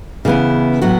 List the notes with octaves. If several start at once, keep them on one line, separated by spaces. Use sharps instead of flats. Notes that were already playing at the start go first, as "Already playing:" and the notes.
C#3 E3 B3 E4
A2 F#3 B3 F#4